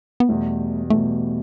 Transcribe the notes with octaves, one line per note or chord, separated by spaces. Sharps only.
B3
E2 B2 G3 A3
E2 B2 G3 A3